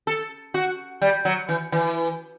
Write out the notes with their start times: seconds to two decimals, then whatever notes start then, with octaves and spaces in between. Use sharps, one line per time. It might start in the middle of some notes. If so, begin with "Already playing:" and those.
0.07 A4
0.54 F#4
1.02 G3
1.25 F#3
1.49 E3
1.72 E3